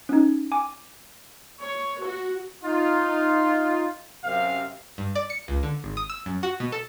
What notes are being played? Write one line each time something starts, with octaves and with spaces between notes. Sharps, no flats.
C#4 D#4
G#5 D6
C#5
F#4
D#4 F4
F#2 C3 F5
G2
D5
C#7
C#2
D3
G#1
D#6
E6
F#2
F#4
B2
A4